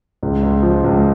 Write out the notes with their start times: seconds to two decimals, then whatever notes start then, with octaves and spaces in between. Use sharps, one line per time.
0.23 C#2
0.43 C#2
0.63 F3
0.84 C#2